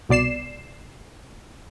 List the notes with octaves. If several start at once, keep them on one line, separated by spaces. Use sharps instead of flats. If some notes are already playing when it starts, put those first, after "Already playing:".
C2 B2 D5 C7 E7